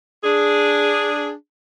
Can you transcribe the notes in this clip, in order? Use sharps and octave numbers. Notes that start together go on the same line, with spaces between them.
D4 G#4